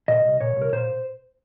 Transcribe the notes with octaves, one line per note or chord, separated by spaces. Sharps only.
A#2 D#5
C2
A#2 C#5
C2
A#4
A#2 C5